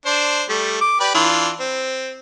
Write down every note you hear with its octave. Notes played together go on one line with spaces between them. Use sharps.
D4 C5
G3 A3
D6
G4 B4 D5
E3 D4 F4
C4